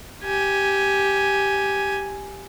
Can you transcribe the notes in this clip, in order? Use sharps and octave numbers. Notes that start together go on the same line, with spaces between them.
G4 G#5